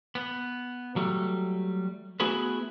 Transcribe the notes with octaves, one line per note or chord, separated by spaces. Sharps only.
B3
F#3 G3 A3
A3 B3 E4 F#4 G#4 B4